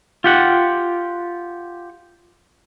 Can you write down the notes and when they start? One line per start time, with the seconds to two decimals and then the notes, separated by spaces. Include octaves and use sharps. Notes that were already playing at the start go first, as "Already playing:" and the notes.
0.24 F4 G4 F#5